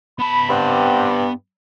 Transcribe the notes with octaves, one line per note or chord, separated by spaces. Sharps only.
B3 A5 B5
G2 C4 G4 F#5